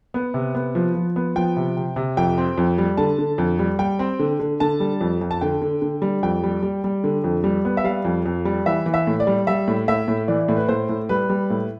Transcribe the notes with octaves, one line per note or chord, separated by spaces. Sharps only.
B3
C3
B3
F3
F3
B3
F3 G5
C3
C3
C3
F2 G5
C4
F2
G3
D3 A5
D3
F2
G3
G3 G5
C4
D3
D3
D3 A5
G3
F2
F2
A5
D3 G5
D3
D3
G3
F2 G5
G3
G3
G3
D3
F2
G3
B3
E5
G3 F5
F2
F2
G3
E3 E5
E3
E5
A2
D5
G3
G3 E5
A2
A2 E5
A2
E3 D5
A2
B4
A2 C5
A2
G3 B4
G3
A2